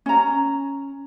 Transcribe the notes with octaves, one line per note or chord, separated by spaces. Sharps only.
C#4 A#5